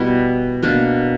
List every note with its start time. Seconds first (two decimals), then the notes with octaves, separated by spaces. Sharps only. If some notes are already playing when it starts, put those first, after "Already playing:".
Already playing: B2 G3 B3 E4
0.62 B2 A#3 D4